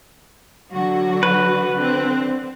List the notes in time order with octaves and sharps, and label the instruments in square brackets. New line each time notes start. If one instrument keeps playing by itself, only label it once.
[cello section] D3 F#3 F#4
[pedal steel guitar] B4
[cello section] D3 C4